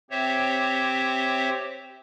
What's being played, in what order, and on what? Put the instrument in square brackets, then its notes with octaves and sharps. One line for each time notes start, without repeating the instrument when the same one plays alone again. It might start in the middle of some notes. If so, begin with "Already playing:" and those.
[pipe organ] C4 G4 C5 C#5 E5